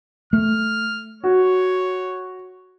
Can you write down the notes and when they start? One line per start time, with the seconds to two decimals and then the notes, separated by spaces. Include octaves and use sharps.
0.33 A3 F6
1.24 F#4 C#5